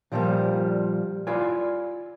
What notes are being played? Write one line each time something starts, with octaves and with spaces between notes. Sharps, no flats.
A#2 F3 G3 A3 A#3
E4 F4 D5 G#5